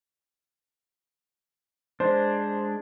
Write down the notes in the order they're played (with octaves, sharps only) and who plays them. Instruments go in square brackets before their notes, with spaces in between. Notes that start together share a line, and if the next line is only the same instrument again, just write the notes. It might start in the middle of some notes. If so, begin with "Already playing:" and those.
[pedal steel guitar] G#3 D4 [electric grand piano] C5